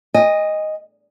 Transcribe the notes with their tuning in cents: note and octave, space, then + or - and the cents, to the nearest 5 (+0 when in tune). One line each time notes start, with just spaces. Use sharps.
D#5 +0 G#5 -40